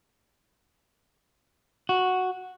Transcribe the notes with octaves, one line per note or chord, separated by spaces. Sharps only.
F#4